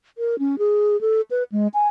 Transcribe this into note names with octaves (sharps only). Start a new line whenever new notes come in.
A#4
C#4
G#4
A4
B4
G#3
G#5